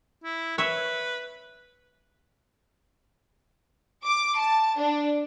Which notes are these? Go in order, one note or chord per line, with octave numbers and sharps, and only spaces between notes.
E4
B4 C#5 E5
D6
A5
D4